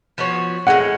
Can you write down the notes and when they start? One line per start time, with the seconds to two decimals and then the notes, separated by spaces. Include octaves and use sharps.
0.18 F3 B3 F#4 C#5
0.67 A2 G#3 C#4 F#5